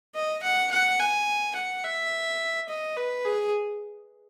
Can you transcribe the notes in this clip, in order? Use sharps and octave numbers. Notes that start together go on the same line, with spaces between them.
D#5
F#5
F#5
G#5
F#5
E5
D#5
B4
G#4